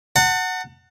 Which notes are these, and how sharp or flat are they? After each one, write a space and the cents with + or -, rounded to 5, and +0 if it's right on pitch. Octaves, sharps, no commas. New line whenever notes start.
F#5 +0 A5 +40